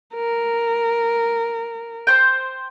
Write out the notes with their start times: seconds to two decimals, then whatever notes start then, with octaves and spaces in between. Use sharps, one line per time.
0.14 A#4
2.07 C5 G5